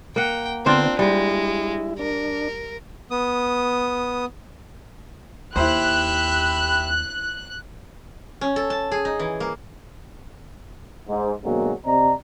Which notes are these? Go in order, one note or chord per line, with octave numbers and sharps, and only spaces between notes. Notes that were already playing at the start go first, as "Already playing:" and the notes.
A#3 F#5 G5
D3 B3 C4 D4 F4 C5
G3 G#3 E4
D4 A#4
B3 D#6
D#2 E4 G4 C5 E5 B5 F#6
C#4
A4
A5
G#4
D#4
E3
A#3
G#2
B2 D3 F#3 G#3 A#3 C4
C3 C4 D5 D#5 A#5